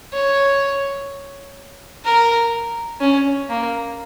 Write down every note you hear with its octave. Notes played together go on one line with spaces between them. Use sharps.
C#5
A#4
C#4
A#3